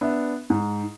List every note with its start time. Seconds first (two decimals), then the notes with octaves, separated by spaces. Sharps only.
0.01 B3 D4 E5
0.50 G#2